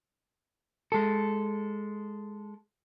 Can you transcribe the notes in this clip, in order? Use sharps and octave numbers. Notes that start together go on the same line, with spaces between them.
G#3 A4